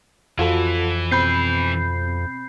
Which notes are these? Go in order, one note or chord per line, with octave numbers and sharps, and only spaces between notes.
F2 E3 F4 F#4 A4
B2 C4 B5 G6 C7